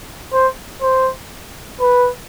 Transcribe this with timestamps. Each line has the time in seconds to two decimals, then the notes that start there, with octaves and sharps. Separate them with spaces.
0.33 C5
0.81 C5
1.80 B4